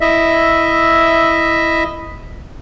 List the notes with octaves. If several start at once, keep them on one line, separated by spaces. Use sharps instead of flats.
E4 D#5 E5